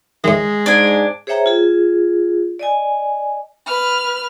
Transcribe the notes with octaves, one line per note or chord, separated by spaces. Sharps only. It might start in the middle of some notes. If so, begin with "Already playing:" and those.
A2 D#3 G#3
G#2 D4 G#5
G#4 C5 C#5 E5 G5 A#5
F4 G#4
D5 D#5 G#5
B4 F6